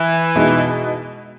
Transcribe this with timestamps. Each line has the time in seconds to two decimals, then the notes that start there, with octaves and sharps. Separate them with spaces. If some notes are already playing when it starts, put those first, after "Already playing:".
Already playing: E3
0.36 B2 G#3 D#4